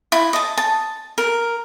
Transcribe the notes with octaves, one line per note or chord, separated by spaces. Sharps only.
E4
D#5 A5
A5
A#4